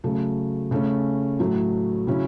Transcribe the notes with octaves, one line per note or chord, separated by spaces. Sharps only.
C#3 F#3 A3
C#3 A3 C#4
A2 F#3 A3
C#3 F#3 C#4 E4